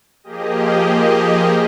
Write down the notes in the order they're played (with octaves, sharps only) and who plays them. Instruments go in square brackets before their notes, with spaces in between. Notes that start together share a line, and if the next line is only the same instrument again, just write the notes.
[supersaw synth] F3 A#3 G4 G#4 D#5